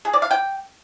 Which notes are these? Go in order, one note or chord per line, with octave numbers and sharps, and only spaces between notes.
G#4
D5
F5
G5